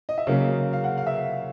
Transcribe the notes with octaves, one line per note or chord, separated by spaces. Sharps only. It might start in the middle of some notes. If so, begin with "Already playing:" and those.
D#5
E5
C#3 F#3 A#3 F5
F5
F#5
F5
E5
F5